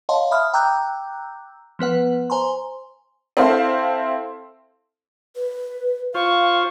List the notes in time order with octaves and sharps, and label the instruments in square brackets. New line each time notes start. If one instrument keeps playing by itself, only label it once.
[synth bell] C#5 D#5 F5 F#5 A5 C6
E5 B5 D#6 F6
G5 A#5 D6 E6 F#6 G6
F3 B3 B4 F#5
C5 G#5 A#5 C6
[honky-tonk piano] C4 E4 A4 C5 F5 C6
[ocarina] B4
[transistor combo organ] F4 C5 [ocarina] F5 [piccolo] C#6